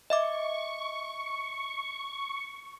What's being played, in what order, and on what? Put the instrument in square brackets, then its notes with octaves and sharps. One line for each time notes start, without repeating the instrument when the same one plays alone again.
[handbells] D#5 E5 D6 [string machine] C#6